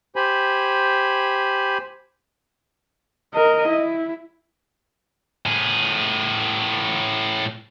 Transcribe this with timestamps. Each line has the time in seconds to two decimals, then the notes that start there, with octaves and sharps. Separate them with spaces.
0.16 G4 C5 G#5 B5
3.34 A#4 D#5
3.68 E4
5.46 A2 G#4